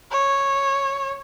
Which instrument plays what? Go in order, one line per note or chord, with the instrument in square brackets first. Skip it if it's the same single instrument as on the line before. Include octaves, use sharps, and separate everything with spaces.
[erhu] C#5